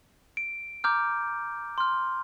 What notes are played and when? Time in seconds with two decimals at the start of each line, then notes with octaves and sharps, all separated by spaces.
0.37 D7
0.84 A#5 D6 F6 G6
1.78 C6 F6